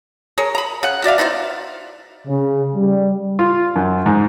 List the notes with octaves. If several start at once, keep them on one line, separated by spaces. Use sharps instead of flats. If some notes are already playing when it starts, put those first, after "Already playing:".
G#4 A#4 C#5
A#5 B5
C#3 F#5
F#4 D5 E5 F5
B3 D#4 E4 C5
C#3
G3
F4
F#2
G#2